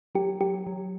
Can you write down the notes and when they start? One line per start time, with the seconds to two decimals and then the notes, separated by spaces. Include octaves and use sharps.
0.15 F#3 G4
0.41 F#3 G4
0.66 F#3